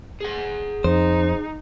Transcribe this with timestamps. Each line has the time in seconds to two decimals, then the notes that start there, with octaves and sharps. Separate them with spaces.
0.21 G#4 F#5
0.84 F2 D#4 C5